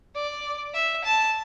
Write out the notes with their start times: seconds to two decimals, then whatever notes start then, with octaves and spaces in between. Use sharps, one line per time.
0.15 D5
0.74 E5
1.04 A5